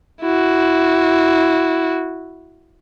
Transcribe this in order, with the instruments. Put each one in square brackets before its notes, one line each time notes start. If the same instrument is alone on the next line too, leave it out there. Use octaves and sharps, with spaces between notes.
[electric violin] E4 F#4